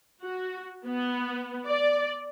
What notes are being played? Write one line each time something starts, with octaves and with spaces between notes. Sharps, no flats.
F#4
B3
D5